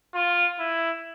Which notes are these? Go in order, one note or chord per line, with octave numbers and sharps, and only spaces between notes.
F4
E4